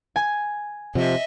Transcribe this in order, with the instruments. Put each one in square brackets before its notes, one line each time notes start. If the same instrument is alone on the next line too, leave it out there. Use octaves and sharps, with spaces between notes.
[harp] G#5
[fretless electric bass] C3 F3 [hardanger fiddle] D#5 E5